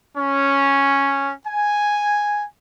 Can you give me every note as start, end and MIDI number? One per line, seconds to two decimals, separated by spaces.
0.16 1.32 61
1.45 2.43 80